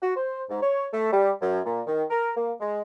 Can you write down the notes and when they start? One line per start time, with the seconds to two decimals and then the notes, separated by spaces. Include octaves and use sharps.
0.03 F#4
0.16 C5
0.50 G#2
0.61 C#5
0.93 A3
1.12 G3
1.42 F#2
1.65 A#2
1.87 D#3
2.11 A#4
2.36 A#3
2.61 G#3